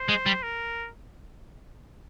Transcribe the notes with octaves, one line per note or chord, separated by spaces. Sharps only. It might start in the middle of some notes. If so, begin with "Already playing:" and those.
Already playing: C5
G#3
G3
A#4